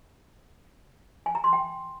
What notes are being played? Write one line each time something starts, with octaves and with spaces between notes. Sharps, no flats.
G#5
A#5
C6
G5